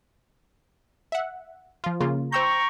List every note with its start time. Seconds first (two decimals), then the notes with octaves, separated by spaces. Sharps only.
1.12 E5 F#5
1.84 F3 F4
2.01 C#3 A#3 F4
2.32 C5 G5 A#5 C#6 E6 G6